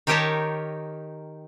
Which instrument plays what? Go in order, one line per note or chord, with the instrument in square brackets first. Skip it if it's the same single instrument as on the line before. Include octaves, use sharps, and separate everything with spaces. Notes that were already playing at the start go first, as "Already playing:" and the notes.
[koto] D#3 D#4 G4 A#4 C#5 A5